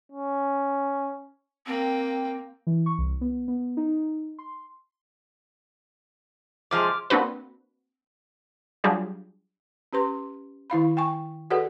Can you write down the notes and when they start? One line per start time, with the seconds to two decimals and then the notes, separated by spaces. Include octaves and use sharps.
0.12 C#4
1.66 A#3 C4 G5
2.67 E3
2.86 C#6
2.98 C2
3.21 B3
3.48 B3
3.77 D#4
4.39 C6
6.71 C3 F3 G#3 D6 F6
7.10 A#3 C4 D4 F#4 B4
8.84 F#3 G3 D4 F4 G4 G#4
9.93 C#4 G4 B4 C6
10.70 D#3 E4 F5 B5
10.97 G5 G#5 C#6
11.50 F#4 G#4 A4 B4 D5 F#5